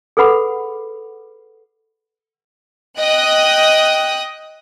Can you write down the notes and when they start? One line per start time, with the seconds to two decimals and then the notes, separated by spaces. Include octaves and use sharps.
0.17 G#4 A4 B4 F#5 B5
2.97 D#5 G5 D#6 F#6